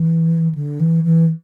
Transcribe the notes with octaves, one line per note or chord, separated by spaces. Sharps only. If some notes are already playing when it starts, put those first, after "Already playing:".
Already playing: E3
D3
E3
E3